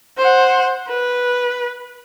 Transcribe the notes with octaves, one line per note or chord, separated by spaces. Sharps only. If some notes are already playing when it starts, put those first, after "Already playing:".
C5 F#5
B4